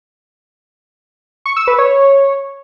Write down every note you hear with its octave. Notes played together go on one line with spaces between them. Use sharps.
C#6
E6
B4
C#5